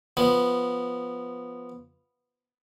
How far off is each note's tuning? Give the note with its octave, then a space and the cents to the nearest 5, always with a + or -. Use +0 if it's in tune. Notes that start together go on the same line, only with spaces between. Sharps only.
F3 +0 B3 +0